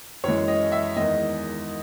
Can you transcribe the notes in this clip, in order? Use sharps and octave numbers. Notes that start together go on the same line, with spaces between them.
F#2 E3 G#3 C#5
D#5
E5
E2 D#3 G#3 D#5